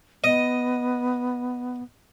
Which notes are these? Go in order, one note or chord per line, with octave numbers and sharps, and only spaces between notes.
B3 D#5